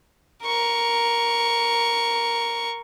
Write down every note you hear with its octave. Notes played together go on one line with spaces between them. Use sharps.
A#4 C#6